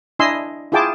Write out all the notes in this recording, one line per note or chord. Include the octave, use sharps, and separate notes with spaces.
D4 E4 D#5 G#5 C6 E6
E4 F4 G#4 G5 A5 D6